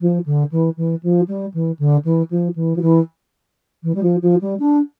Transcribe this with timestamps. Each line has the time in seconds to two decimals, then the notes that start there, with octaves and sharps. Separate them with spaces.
0.01 F3
0.26 D3
0.51 E3
0.77 E3
1.03 F3
1.28 G3
1.53 E3
1.79 D3
2.04 E3
2.30 F3
2.55 E3
2.76 F3
2.81 E3
3.83 E3
3.95 G3
4.03 F3
4.22 F3
4.41 G3
4.59 D4